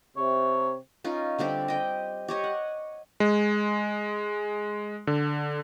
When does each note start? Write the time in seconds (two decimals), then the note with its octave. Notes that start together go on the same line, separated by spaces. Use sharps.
0.17 C3 C#5
1.04 C#4 D#4 F4
1.38 D3 G3 C4 G4
1.68 D#5 G5
2.28 G4 C#5 D#5
2.44 F#5
3.20 G#3
5.07 D3